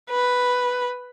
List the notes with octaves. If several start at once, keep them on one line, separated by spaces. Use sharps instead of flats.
B4